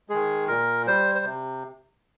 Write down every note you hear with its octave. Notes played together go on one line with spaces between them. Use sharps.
D#3 G#3 G#4
A#2 A#4
G3 C5
C5
C3